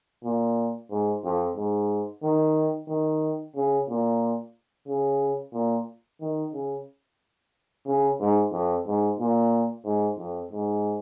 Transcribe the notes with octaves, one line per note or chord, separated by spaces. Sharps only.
A#2
G#2
F2
G#2
D#3
D#3
C#3
A#2
C#3
A#2
D#3
C#3
C#3
G#2
F2
G#2
A#2
G#2
F2
G#2